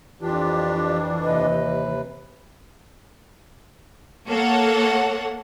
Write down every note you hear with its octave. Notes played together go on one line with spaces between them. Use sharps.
F2 E3 D4 F4 G4
D#2 C3 B4 D#5
A#3 A4 C#5 F#5